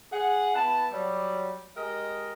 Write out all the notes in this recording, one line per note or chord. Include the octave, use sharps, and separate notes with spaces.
G#4 F#5
B3 E4 A5
F#3 G3
G#3 G4 A#4 D#5